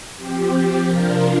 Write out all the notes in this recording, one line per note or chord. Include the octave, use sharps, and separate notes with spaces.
F3 C4 G4
F3 C4
C3 F3 D4 F4 A#4